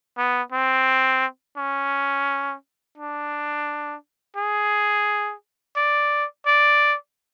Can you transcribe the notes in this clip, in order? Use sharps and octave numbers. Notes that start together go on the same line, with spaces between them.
B3
C4
C#4
D4
G#4
D5
D5